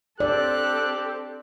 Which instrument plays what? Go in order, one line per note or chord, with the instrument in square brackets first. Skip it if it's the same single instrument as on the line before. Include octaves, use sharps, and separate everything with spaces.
[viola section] C4 A4 [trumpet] G4 [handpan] D5 [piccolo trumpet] F#6